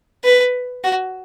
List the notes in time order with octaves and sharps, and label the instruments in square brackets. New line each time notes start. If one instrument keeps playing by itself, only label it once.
[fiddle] B4
F#4